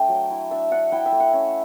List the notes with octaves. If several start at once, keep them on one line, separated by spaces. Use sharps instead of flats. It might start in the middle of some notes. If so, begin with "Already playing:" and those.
Already playing: A3 D4 G5
F#3
E4
D4 E5
D4 F#5
E4 G5
E5
A3
F#5
C#4